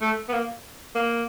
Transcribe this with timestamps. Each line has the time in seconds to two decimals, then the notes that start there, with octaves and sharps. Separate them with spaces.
0.01 A3
0.29 B3
0.33 A#3
0.95 A#3